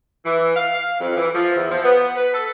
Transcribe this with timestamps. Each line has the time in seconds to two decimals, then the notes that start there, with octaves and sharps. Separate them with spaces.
0.25 E3
0.56 F5
1.01 F2
1.17 E3
1.35 F3
1.56 E2
1.71 F3
1.83 B3
2.15 B4
2.34 A4